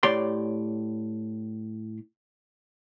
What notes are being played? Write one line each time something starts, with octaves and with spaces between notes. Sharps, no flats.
A2 G4 C#5 D5 C6